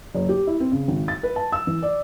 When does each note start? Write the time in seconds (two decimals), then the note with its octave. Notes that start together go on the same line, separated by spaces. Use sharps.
0.15 F#1
0.29 G4
0.47 E4
0.60 C4
0.72 C#3
0.88 G#1
1.08 A6
1.23 B4
1.36 A5
1.52 E6
1.67 E3
1.82 D5